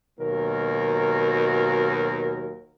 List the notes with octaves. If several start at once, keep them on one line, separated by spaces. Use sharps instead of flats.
D#2 B2 F#3 A#4